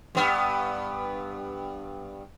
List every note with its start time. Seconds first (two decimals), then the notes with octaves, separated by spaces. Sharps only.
0.15 G2 B3